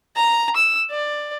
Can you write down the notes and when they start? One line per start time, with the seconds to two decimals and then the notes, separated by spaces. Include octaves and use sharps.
0.16 A#5
0.56 E6
0.91 D5